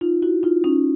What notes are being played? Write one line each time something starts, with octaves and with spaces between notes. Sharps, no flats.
D#4 F4
E4 F#4
D#4 F4
C#4 D#4